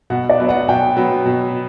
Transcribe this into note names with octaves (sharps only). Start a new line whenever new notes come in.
B2 F#5
D5
F#3 B3
F#5
B2 G5
F#3 B3
B2